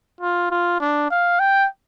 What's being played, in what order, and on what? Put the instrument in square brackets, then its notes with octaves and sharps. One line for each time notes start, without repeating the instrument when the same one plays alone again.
[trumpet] F4
F4
D4
F5
G5